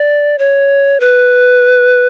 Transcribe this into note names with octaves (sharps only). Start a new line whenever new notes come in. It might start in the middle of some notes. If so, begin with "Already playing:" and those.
Already playing: D5
C#5
B4